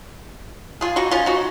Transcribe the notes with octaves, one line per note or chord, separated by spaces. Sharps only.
F4 G#4
D#4 F#4
C#4 F4
D#4 F#4